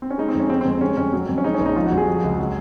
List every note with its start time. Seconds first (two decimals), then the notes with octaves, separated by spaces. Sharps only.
0.02 C4
0.10 C#4
0.18 G#3 D#4
0.28 C4
0.35 F2 C#4
0.50 G#3 C4
0.61 C4
0.66 F2
0.71 C4
0.81 G#3 C#4
0.97 F2 C#4
1.13 F#3 C4
1.29 F2
1.38 C#4
1.44 G#3 D#4
1.54 C#4
1.60 A#1
1.66 D#4
1.76 F3 F4
1.86 F#4
1.92 F2
1.97 G#4
2.08 F3
2.24 C#2
2.39 F#3